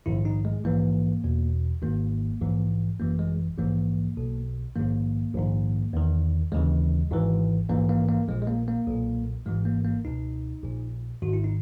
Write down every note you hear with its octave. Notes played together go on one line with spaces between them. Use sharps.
A#1 G#2 D#3 E4
D#4
G#3
A#1 G#2 E3 A#3
E2 B2
G#1 G#2 D#3 A#3
A#1 G#2 E3
G#1 F#2 E3 A#3
G#3
A#1 G#2 E3 A#3
B1 B2
A#1 G#2 D#3 A#3
A#1 G#2 D#3
E2 D#3
D#2 C#3 E3 G#3
G#1 G#2 E3
A#1 G#2 E3 A#3
A#3
A#3
A#1 A#2 G#3
G#3
A#3
A#3
B1 A#2
G#1 G#2 E3 G#3
A#3
A#3
C#2 B2 D#4
A#1 A#2
G#1 G#2 D#3 F#4
E4
D#4